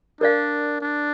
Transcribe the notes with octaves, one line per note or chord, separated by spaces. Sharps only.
D4 A#4 D5 F5
D4